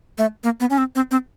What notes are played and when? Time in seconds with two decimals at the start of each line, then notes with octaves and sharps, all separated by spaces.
0.18 A3
0.44 A#3
0.60 B3
0.70 C#4
0.78 C4
0.95 C4
1.11 C4